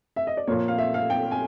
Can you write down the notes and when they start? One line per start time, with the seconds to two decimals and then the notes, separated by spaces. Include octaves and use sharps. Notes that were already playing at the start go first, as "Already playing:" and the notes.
0.16 E5
0.27 D#5
0.37 D5
0.47 A#2 F3 A#3 C#5
0.68 F5
0.78 E5
0.94 F5
1.10 G5
1.31 G#5